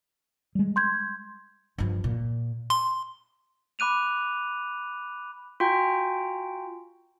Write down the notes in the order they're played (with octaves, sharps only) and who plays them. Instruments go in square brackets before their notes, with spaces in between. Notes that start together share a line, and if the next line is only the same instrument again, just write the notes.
[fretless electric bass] G3 G#3
[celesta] C6 G6 G#6
[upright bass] G2 F3
A#2
[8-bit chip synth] C6
[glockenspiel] B5 D6 F#6 D#7 F7
[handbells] F4 F#4 G5 G#5 A#5